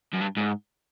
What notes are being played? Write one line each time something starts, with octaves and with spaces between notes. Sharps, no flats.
F#2
G2
G#2